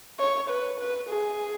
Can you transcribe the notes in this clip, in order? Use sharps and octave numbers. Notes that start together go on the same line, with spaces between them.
C#5
B4
B4
G#4